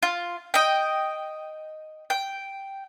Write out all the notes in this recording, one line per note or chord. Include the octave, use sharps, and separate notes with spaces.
F4
D#5 G5
G5